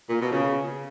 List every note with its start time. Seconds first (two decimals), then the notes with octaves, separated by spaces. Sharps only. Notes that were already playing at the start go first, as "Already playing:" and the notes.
0.10 A#2
0.21 B2
0.31 C#3